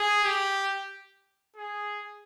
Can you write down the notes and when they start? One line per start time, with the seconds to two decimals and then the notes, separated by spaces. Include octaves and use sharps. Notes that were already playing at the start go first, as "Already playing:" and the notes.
Already playing: G#4
0.24 G4
1.56 G#4